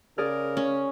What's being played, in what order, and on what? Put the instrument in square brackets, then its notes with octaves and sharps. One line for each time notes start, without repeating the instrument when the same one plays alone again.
[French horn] C#3 [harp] G#4 D5 F6 [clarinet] A#4
[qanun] C#4